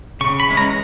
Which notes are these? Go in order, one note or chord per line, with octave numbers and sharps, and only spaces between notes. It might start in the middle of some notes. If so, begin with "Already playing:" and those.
C#3 C#6
B5
E3 G#3 C#4
A#5